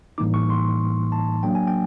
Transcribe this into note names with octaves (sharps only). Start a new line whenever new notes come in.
A2 E3 G3 A#3 D#4 D6
C#6
C6
A5
F#3 A#3 D4 G5
G#5
G5